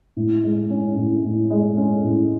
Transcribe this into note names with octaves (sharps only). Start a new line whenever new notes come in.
A2
G#3
C#4
A2
A2
G#3
C#4
A2